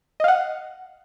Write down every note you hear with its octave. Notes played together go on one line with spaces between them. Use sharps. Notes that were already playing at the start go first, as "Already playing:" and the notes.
D#5 F5 F#5